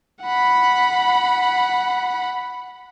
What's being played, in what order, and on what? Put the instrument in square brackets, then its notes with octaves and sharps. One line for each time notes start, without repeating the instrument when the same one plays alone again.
[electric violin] F#5 B5